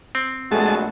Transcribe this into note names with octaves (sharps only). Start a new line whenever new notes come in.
C4
A#1 B2 G#3 A3 F#4 A5